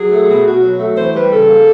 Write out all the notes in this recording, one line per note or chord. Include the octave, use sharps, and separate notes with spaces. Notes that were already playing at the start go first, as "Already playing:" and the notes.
Already playing: F#3 G#4
A3
B2
B2 F#4
F#3
A3
E3 C5
G3 B4
C#3 A4
A#3